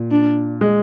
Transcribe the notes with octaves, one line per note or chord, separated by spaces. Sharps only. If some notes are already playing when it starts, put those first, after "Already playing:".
Already playing: A#2
D4
G#3